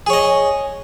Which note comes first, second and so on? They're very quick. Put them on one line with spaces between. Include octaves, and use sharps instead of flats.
G#4 C#5 D#5